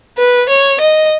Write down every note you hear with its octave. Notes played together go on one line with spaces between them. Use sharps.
B4
C#5
D#5